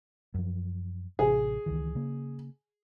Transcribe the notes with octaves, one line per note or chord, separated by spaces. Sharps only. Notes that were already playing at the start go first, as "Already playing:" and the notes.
F#2 F3
A1 C3 G#4
C#2 D#3 E3
C#3 A#3